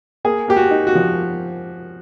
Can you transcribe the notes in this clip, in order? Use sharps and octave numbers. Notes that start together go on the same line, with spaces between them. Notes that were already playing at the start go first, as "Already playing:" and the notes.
A#3 G#4
A#3 G4
F#4
D#4
F#4
F3